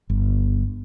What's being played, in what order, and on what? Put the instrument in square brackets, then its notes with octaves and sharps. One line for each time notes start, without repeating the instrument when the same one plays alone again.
[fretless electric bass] G1